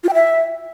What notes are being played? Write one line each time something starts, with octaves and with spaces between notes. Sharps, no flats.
F4
G5
E5